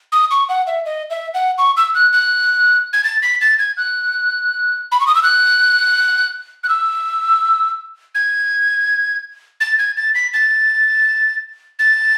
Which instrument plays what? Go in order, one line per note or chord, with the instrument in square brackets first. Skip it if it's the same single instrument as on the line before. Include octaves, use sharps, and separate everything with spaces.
[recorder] D#6
C#6
F#5
E5
D#5
E5
F#5
C#6
E6
F#6
F#6
G#6
A6
B6
A6
G#6
F#6
B5
C#6
D#6
E6
F#6
F#6
E6
G#6
A6
G#6
A6
B6
A6
A6